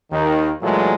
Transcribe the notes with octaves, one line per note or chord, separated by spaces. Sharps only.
D#2 D#3
A#2 E3 F#3 G#3 A3